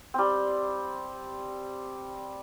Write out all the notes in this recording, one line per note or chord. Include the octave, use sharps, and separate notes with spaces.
G3 C4